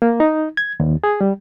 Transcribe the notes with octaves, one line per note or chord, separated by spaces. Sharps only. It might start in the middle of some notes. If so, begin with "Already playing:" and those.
A#3
D#4
G#6
D#2
G#4
G3